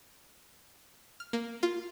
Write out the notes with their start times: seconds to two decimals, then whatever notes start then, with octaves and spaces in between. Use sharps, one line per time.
1.20 F6
1.33 A#3
1.63 F4